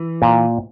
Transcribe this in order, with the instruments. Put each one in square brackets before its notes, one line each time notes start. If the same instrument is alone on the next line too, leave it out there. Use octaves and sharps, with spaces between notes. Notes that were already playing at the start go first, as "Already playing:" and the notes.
Already playing: [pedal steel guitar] E3
[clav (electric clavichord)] A#2